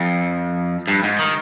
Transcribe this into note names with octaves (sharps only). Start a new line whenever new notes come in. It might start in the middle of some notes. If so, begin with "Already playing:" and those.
Already playing: F2
G2
G#2
D#3